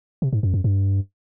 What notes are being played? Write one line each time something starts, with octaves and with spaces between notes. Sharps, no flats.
C3
G#2
F#2
F#2
G2